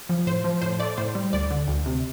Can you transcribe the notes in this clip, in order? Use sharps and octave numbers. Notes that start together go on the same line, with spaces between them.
F3
A2 C5
F3
A2 C5
A3 D5
A2 C5
G3
D2 D5
D3
D2
C3